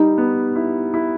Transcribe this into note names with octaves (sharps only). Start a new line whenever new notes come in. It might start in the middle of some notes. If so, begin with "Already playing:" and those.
Already playing: G3 D#4
B3
E4
E4